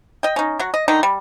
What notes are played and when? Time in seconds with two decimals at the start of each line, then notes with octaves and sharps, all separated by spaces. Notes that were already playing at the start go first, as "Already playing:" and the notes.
0.23 D#5 G5
0.36 C#4 D#4
0.59 F#3 F#4
0.74 D#5
0.88 D3 D#3 D#4
1.03 G3